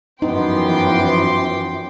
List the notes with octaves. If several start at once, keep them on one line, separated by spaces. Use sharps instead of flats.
F#2 E3 F3 B3 D#4 G5 C6 D6